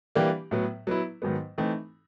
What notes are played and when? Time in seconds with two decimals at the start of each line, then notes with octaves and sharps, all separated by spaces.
0.15 E3 G3 A#3 D4 G4
0.51 A2 F#3 B3
0.87 F#3 B3 E4
1.22 G#2 D#3 F#3 B3
1.58 E3 A3 C4 D#4